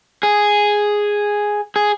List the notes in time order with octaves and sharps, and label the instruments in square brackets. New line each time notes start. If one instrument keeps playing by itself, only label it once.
[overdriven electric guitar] G#4
G#4